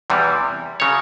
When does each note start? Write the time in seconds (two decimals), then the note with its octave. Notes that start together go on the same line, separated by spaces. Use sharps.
0.10 E2 C3 E3 G3
0.80 C#3 F#3 C#5